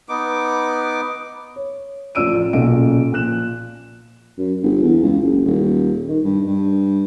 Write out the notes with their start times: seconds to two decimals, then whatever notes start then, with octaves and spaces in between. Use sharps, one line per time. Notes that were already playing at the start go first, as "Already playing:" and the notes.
0.09 B3 D#4 D6
1.56 C#5
2.15 A1 F3 D5 E6 D7 D#7
2.53 B1 A#2 C#3 D#5 D7
3.12 A#2 F3 F#6 E7
4.38 F#2
4.63 G1
4.82 E2
5.03 C#2
5.21 F#1
5.45 D#1
6.08 D#3
6.24 G2
6.47 G2